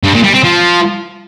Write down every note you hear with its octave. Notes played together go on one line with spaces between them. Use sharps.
G2
A#2
G3
C4
F3